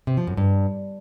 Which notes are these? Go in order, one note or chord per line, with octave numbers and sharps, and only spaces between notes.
C3
F3
F#2
G2